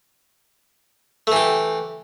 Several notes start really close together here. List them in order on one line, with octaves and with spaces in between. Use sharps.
A3 E3 G4